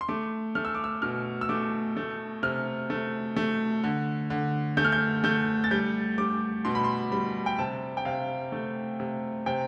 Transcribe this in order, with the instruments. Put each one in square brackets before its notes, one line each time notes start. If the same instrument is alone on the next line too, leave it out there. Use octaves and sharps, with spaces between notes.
[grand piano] C6
A3 D6
A3 F6
E6
D6
E6
B2 F6
E6
A3 D6
A3
C3 F6
A3
A3
D3
D3
A3 G6
F6
G6
A3 G6
A6
G3 G6
G3 D6
B2 C6
B5
C6
G3 B5
G5
C3 A5
G5
C3 F5
A3
C3
C3 G5